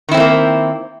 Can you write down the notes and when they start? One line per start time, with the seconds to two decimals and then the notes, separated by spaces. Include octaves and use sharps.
0.09 D#3
0.11 E4
0.14 C4
0.17 A3
0.20 A#3